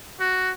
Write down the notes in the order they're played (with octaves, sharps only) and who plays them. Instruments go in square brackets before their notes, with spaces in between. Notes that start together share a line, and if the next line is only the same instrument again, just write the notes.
[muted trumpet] F#4